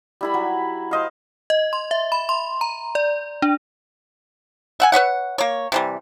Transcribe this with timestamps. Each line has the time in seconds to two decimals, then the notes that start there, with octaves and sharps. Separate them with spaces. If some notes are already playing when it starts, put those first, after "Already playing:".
0.21 G3 E4 B5
0.34 F#3
0.91 C5 D#5 F5
1.50 D#5
1.73 C6
1.91 E5
2.12 B5
2.29 C6
2.61 A#5
2.95 D5
3.42 D4
4.80 E5 F#5 G#5
4.92 B4 C#5 E5 F#5
5.38 A#3 C#5
5.72 C3 E3 G3